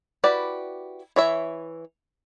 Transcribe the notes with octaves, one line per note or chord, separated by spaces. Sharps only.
E4 F#4 G4 B4 D5
E3 C#5 E5